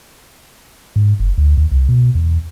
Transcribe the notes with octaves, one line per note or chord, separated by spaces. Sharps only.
G#2
F#1
D2
D#2
C2
B2
E2